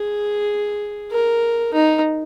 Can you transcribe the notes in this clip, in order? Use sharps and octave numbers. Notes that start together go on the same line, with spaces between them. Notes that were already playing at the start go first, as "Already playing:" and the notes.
Already playing: G#4
A#4
D#4